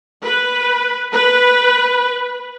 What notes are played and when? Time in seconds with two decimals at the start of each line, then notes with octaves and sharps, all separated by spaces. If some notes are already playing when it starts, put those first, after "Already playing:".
0.24 B4
1.12 B4